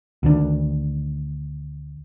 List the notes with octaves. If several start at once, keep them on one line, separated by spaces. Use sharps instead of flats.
D2 D#3 D4